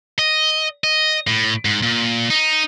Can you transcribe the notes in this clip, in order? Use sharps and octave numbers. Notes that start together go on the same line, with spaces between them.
D#5
D#5
A2
G#2
A#2
D#4